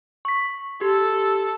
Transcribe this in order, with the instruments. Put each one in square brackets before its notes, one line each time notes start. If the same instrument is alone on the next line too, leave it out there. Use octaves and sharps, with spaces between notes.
[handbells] C#6 B6
[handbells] G4 [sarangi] A4